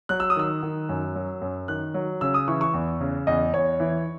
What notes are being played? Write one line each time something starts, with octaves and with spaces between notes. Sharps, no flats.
F#3 F#6
E6
D#6
D#3 E6
D#3
F#2
F#3
F#2
D#3 F#6
F#3
C#3 E6
D#6
E3 C#6
C#6
E2
C#3
E2 D#5
E2 C#5
E3